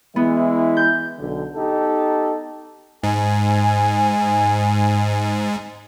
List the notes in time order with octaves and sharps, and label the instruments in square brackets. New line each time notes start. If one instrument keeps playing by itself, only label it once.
[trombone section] E3 G#3 E4 [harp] B3
[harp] G6
[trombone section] B1 D3
D#4 G4 A4
[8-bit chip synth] G#2 [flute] G#5